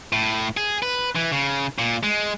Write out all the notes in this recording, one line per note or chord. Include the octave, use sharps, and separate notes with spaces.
A2
G#4
B4
E3
C#3
A#2
G#3